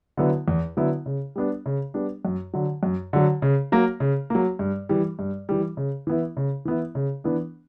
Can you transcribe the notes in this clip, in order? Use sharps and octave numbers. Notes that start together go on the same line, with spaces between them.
D3 F#3 B3 E4
E2
D3 F#3 B3 E4
C#3
G3 B3 D4
C#3
G3 B3 D4
F#2
D3 F#3
F#2
D3 F#3
C#3
F#3 A#3
C#3
F#3 A#3
G2
E3 G3
G2
E3 G3
C#3
E3 B3 E4
C#3
E3 B3 E4
C#3
E3 B3 D4